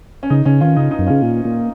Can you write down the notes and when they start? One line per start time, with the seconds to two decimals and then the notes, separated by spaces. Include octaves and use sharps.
0.23 C#4
0.30 C#3 D#4
0.45 C#3 C#4
0.61 D#3 C#4 F4
0.76 C#3 D#4
0.91 D#4
0.99 F#2
1.07 C#3 C#4 F4
1.22 A#2
1.45 A#2